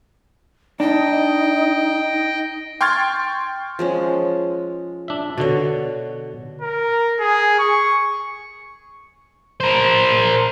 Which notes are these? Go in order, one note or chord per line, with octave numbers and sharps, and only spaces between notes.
D4 D#4 D#5 G5
G5 C6 C#6 F6 G#6 A6
F3 G#3 C#4
D4 E5
B2 D3 F#4 C#5
A#4
G#4
C#6
A#4 C5